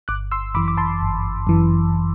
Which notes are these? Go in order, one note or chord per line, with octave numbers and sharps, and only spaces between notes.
G1 D6 F#6
C6 E6
F#2 E3 B5 D6
D6
A5 C6
G1
F#2 E3